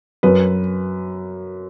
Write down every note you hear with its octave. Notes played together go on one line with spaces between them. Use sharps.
F#2 B4